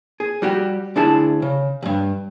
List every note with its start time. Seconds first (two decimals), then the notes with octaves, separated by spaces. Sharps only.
0.20 G#4
0.42 G3 F#4 G4
0.96 D2 D4 E4 G#4 A5
1.42 C#3
1.82 D2 G2